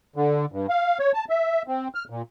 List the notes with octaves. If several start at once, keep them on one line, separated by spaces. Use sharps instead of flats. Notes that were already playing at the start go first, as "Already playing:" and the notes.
D3
G2
F5
C#5
A5
E5
C4
F6
A#2